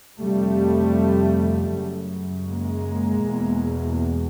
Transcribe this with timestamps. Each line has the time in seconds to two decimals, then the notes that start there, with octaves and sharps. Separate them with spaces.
0.21 F2 C3 G3 A3
1.73 F#2 C#3
2.48 G#3 A#3
3.23 E2 B2